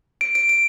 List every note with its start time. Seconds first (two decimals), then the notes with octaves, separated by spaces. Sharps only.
0.21 D7
0.35 D7
0.49 D7